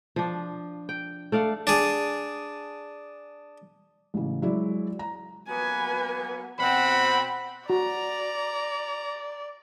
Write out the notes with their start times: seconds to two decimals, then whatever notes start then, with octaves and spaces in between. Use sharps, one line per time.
0.16 F3 D4
0.89 G5
1.32 A3 D5 F5 F#5
1.67 D4 G#4
4.14 A1 C#3
4.42 F#3 G#3 E4 D5
4.99 A#5
5.48 F#3 A#3 B3 B4 G#5
6.59 B2 C4 F#5 B5
7.70 F#4 D5 A#5